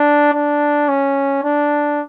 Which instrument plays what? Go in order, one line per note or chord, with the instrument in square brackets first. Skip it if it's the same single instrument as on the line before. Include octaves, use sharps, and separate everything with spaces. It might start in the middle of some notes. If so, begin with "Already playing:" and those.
Already playing: [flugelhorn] D4
D4
C#4
D4